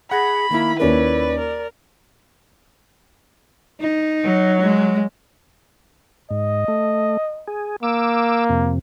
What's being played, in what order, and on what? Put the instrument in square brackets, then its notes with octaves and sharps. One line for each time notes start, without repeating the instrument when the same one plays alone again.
[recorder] G#4 [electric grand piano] F#5 G#6 A#6 [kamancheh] B5
[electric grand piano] D#3 E4 [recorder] A#3
[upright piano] D#2 C#4 A#4 [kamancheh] B4 [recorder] D5
[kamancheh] A#4
[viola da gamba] D#4
[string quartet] F#3
[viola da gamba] G#3
[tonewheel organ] G#2 [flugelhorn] D#5
[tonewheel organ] A3
G#4
[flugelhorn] A#3 [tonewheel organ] D6 E6
[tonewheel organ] F2 C3